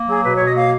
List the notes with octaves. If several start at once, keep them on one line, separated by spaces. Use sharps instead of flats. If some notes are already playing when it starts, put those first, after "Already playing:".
Already playing: A#3
F#3 G#4
B2 B4
C#5
B2 D#5
A#3 F5